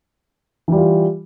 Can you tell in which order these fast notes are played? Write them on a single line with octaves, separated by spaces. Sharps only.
E3 G3 F4